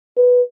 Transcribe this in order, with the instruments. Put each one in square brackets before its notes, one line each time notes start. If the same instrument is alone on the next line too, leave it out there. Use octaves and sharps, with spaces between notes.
[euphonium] B4